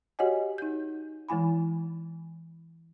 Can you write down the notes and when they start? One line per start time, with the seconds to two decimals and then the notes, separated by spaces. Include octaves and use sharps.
0.19 F#4 G4 C#5 D#5 F#5 G#5
0.58 D#4 G6
1.29 E3 G#3 E4 G#5 B5